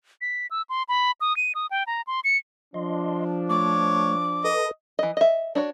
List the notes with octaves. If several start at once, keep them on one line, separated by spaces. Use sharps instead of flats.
B6
E6
C6
B5
D#6
D#7
D#6
G5
A#5
C6
C#7
F3 D4 D#5 C6
A3 C#5 D6
A4 B4 D#5
E3 D#5
D#5 E5
D4 F#4 C#5